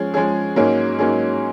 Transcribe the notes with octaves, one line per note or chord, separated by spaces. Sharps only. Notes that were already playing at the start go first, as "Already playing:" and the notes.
Already playing: F3 G#3 C#4 G#4
F3 G#3 C#4 G#4
G#2 F#3 A#3 C#4 G#4
G#2 F#3 A#3 C#4 G#4